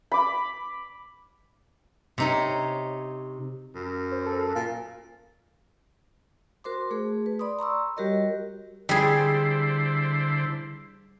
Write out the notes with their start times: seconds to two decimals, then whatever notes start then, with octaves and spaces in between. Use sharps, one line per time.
0.12 B5 D6
2.18 C3 D#4 C#5
3.75 F#2
4.12 C5
4.26 A4
4.55 A#2 F4
6.64 F#4 A#4 C5 C6 D6
6.91 A3 G#4
7.26 B4
7.39 D5 B5 C6 D#6
7.59 A#5 C6 C#6 E6
7.97 G3 F#4 G4 A#4 C#5 D#5
8.89 D3 G3 E4 G#4 C5